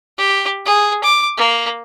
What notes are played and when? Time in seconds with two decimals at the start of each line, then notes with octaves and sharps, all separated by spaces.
0.18 G4
0.66 G#4
1.04 D6
1.38 A#3